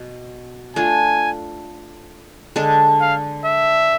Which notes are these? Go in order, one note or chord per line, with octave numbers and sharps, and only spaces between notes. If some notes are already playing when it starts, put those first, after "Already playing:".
Already playing: B2
A3 D4 F4 G#5
D3 G#3 D4 A4
F5
E5